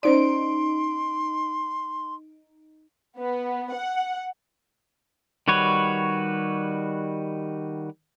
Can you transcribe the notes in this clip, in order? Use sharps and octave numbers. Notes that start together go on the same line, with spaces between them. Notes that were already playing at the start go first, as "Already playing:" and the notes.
C#4 D#4 C5 D5 C6 D7
B3
F#5
D#3 G3 F#4 B4 C#5